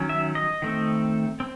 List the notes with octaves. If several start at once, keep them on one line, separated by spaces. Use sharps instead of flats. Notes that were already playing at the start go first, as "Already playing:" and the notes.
Already playing: D#3 F#3 C#4
E5
D#5
D#3 A3 C4
C4